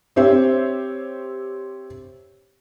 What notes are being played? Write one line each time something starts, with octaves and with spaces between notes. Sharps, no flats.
C4 G4 C5 C#5 E5